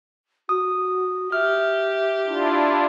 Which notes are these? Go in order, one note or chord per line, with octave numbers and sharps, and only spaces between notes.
F#4 D#6
G4 E5 F6
D4 E4 F4